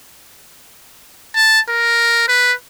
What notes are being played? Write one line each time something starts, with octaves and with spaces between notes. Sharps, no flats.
A5
A#4
B4